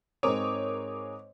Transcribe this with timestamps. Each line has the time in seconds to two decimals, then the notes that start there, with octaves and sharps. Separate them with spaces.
0.23 G#2 G#3 C4 A#4 C#5 D6 D#6